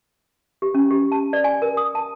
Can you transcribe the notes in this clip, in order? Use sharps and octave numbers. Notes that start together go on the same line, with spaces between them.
G4
C#4
G4
A5
D5
G#5
A#4
D#6
A5